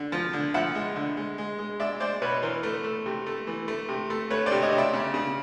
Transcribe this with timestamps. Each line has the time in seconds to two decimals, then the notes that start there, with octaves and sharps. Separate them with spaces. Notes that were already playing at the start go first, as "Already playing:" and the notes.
Already playing: D3
0.12 F3
0.33 D3
0.54 F3 E5 F#5
0.75 G#3
0.96 D3
1.17 G#3
1.38 G#3
1.58 G#3
1.80 G#3 D5 E5
2.00 G#3 C5 D5
2.21 B2 B4 C#5
2.42 E3 A#4 C5
2.63 A3
2.84 A3
3.06 C3
3.26 A3
3.47 E3
3.68 A3
3.89 C3
4.10 A3
4.30 A3 B4 C#5
4.46 C5 D5
4.52 C3
4.62 C#5 D#5
4.73 C3
4.78 D5 E5
4.93 C#3
5.14 C#3